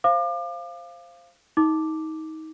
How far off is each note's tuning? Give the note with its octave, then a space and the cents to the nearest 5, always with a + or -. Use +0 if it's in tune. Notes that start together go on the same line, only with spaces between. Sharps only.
C5 +10 F5 -15 D6 +35
D#4 +25 D6 +0